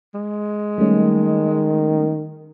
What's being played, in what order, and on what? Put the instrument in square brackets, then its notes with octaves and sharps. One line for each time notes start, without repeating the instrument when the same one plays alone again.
[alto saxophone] G#3
[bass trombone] D#3 [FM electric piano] G3 A3 C#4